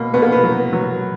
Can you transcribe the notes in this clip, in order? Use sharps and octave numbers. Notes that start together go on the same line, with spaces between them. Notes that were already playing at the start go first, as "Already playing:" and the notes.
Already playing: B2 A#3
B2 B3
A#3
B3
F#3
F#3